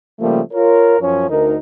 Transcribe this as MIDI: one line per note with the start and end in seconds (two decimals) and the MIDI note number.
0.19 0.39 49
0.19 0.39 53
0.19 0.39 55
0.19 0.39 57
0.19 0.39 58
0.52 0.95 65
0.52 0.95 70
0.52 0.95 73
0.99 1.28 42
0.99 1.28 53
0.99 1.28 61
0.99 1.28 73
1.28 1.56 38
1.28 1.56 63
1.28 1.56 70